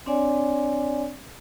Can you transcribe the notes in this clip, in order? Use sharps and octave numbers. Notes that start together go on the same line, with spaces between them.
C4 D4 C#5 D5 G#5